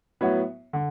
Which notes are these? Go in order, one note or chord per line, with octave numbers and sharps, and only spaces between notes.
A2 F#3 B3 F#4 C#5
D3